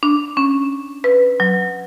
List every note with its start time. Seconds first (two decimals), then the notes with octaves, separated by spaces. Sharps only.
0.03 D4
0.37 C#4
1.04 B4
1.40 F#3